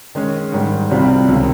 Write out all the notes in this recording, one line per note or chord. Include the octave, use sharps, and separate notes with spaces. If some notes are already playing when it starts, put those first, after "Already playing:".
D#3 G#3 C#4
G#2 D#3 G3
C2 C3 G3 C4 F4
C#2 C3 D#3